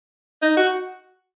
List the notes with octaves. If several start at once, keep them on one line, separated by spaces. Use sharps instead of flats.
D#4
F#4